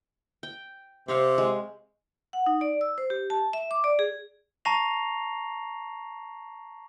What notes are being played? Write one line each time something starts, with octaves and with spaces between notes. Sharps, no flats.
G5
C3 C4 C#5 F5
G#3
F#5
D#4
D5
E6
C5
G4
A5
E5
D6
D5
G#4
A5 A#5 C#6 A#6 C7 F7